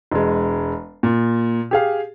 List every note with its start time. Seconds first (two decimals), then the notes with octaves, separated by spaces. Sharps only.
0.12 E1 G#3
1.03 A#2
1.71 G4 G#4 F5